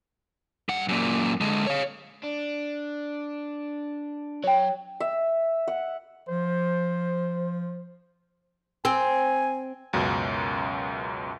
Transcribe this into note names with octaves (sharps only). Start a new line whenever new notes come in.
G2 F#5
F#2 A#2
D3 G#3
C#5 F5
D4
F#3 C#5 G5
E5
F#5
F3 C5
C4 G#5
C#2 F#2 B2